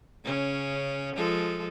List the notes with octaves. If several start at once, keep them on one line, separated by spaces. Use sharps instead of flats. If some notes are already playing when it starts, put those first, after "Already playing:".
C#3 C#4
F3 G#3 A4